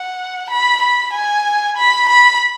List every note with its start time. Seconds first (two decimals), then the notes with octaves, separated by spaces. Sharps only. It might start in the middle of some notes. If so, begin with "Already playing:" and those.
Already playing: F#5
0.50 B5
0.82 B5
1.13 G#5
1.77 B5
2.10 B5